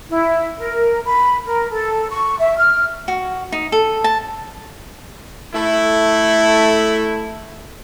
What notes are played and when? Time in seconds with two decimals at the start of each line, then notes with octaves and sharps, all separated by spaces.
0.10 E4
0.58 A#4
1.05 B5
1.45 A#4
1.72 A4
2.10 C#6
2.39 E5
2.57 F6
3.08 F#4
3.52 D#4
3.72 A4
4.04 A5
5.53 A3 E4